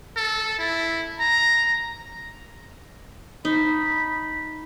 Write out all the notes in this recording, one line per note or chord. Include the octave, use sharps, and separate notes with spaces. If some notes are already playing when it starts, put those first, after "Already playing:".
A4
E4
A#5
D#4 B5